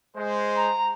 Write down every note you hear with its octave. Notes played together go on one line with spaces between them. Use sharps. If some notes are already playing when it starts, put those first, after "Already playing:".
G#3 C5
A#5